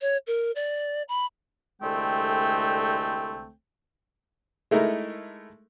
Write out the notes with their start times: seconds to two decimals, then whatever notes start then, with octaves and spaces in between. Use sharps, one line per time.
0.01 C#5
0.27 A#4
0.55 D5
1.08 B5
1.82 C2 D3 G#3 A3 C4 G5
4.71 G#3 A3 D#4 E4 A#4